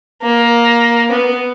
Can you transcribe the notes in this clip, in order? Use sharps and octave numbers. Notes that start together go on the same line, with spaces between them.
A#3
B3